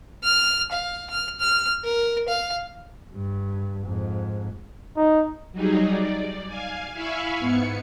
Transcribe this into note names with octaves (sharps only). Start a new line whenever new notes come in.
F6
F5
F6
F6
A#4
F5
G2
F2 G#2
D#4
F#3 G3 D#4 G#4
D5
F5 G#5
E4 E5 F5 G#5 B5 C#6
G#2 B3 C#7